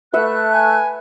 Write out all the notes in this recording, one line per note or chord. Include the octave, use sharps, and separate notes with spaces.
A3 B4 E5 F#5 F#6
G#5